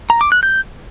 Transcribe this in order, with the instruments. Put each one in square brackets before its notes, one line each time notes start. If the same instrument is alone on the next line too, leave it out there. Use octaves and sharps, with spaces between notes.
[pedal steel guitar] A#5
D6
F#6
G6